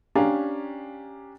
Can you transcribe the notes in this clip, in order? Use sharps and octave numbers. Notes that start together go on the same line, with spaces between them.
C#4 D4 G4 F5 G#5 A#5